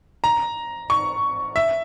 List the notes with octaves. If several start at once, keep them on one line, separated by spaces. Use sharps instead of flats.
A#5
C#6
E5